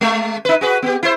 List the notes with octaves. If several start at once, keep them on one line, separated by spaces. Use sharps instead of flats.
G#3 A3
D#4 B4
F#4 G#4 B4
B3 G4
E4 C5